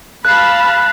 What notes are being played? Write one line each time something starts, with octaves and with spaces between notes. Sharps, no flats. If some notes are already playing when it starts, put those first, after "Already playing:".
F5 A5 B5 F#6 C7